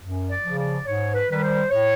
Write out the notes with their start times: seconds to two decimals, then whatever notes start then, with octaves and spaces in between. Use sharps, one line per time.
0.01 F#2
0.30 D5
0.44 C#3 F3
0.58 D5
0.86 G#2 C#5
1.14 B4
1.28 D#3 G3 B4
1.42 C5
1.70 A2 C#5